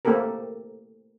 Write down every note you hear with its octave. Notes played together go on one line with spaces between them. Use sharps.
A3 A#3 C4 G4 A4 A#4